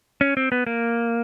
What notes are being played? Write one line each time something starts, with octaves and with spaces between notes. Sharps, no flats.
C#4
C4
B3
A#3